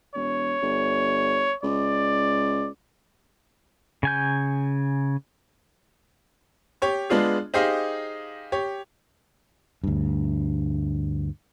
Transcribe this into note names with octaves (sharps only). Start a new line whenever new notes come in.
E1 C#5
G1
C#2 D5
C#3 G#5 G6
G4 C#5 C#6
G#3 B3 D4 F4 G#4
D#4 G4 G#4 C5 D#5 F5
G4 C#5
D2 G2